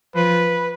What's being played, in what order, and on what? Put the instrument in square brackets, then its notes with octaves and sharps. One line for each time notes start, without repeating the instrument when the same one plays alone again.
[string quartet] F3 [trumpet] B4